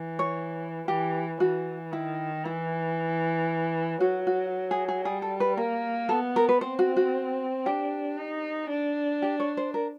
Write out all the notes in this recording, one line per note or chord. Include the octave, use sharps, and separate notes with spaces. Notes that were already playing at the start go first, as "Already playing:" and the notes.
Already playing: E3
C#5
E3 G4
E3 F#4
D#3 E4
E3 E4
F#3 F#4
F#4
G#4
G#4
G3 G#4
A4
B4
A#3 A#4
B3 A4
A#4
B4
C4 C5
F#4
F#4
D4 G4
D#4
D4
G4
C#5
C5
A#4